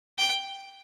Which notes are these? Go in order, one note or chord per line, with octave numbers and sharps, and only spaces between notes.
G5